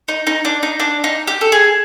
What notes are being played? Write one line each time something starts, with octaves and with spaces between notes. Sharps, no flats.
D#4
D#4
D4
D#4
D4
D#4
G4
A4
G#4